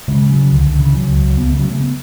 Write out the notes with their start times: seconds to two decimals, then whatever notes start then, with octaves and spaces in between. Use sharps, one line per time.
0.08 C#3 G#3
0.22 C#3
0.30 F#3
0.36 C#3
0.51 C#2 D3
0.66 C#2 D3
0.79 C#3 E3
0.94 C#3 F#3
1.08 C#2
1.23 C#2
1.37 C#2 B3
1.49 C#3 A3
1.59 F#3
1.66 C#3 A3
1.80 B3